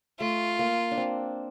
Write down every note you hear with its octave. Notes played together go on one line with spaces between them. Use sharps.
A3 F4
A#3
D4
C4